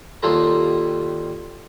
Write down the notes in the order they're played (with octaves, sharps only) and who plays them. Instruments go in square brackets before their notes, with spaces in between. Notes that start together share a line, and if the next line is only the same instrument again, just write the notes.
[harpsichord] D#2 G3 F4 A4 A#5